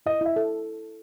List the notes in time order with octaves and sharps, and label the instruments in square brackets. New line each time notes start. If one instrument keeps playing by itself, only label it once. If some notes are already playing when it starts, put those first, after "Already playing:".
[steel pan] E4 [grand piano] D#5
[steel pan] E4 [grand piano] E5
[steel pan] A4